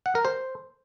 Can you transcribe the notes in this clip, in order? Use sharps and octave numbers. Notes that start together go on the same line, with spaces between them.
F#5
A#4
C5